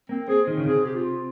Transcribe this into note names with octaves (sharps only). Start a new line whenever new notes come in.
A#3 C4
C4 G#4
D#3
C#3
C3 G#4
G4
F4